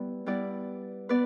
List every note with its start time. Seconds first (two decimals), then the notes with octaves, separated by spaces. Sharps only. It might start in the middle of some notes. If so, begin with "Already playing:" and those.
Already playing: G3 B3 E4 B4 D5
0.26 G3 B3 E4 B4 D5
1.09 B3 B4 D5